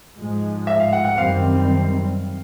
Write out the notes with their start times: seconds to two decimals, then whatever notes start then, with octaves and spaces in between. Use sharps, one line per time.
0.17 G#2 F3 G#3
0.67 E5
0.80 F5
0.93 F#5
1.05 F#5
1.17 F#2 D#3 G3 C4 F5